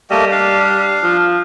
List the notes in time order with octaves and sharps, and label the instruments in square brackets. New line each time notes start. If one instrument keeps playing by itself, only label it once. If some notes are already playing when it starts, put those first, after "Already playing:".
[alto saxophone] G3 [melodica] A3 A#3 D#5
[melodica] D4 F5
[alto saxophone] F3